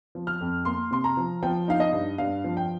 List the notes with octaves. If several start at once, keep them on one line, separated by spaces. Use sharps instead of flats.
F3
F6
F2
A#3 C6
C3 C6
A#5
F3
F3 G5
D#4 F5
D#5
G2
G2 F5
F3
G5